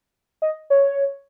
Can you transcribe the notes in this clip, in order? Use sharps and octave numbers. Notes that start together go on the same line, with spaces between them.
D#5
C#5